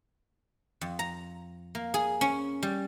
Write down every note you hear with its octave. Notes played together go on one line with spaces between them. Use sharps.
F2
A#5
A#3
G#4
C#4
G3